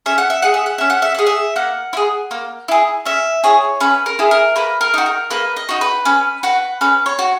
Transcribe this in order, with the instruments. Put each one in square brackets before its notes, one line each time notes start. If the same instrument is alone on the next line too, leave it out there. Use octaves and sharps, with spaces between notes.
[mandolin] C#4 E5
F#5
E5
G#4 F#5
E5
F#5
C#4 E5
F#5
E5
G#4 F#5
E5
A#3 F#5
E4
G#4
A#3
E4 G#4
C#4 E5
E4 G#4 C#5
C#4 B4
A#4
E4 G#4
A#4
A#3 B4
A#4
D#4 F#4
A#4
A#3 B4
D#5
D#4 F#4
B4
C#4 B4
F#4 B4
C#4 B4
C#5
F#4